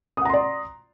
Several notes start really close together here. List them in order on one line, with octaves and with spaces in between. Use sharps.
D#6 F#5 A#5 C6 D5